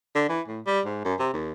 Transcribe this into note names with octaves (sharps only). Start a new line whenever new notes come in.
D3
E3
A2
G3
G#2
F#2
C3
D#2